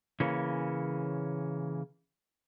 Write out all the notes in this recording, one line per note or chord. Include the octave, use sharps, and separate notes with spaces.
C#3 E3 A#3 C#4